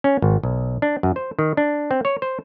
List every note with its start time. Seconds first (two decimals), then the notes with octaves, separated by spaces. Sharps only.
0.04 C#4
0.22 G#1
0.43 B1
0.82 D4
1.03 F#2
1.16 C5
1.39 D#3
1.57 D4
1.91 C4
2.05 C#5
2.22 C5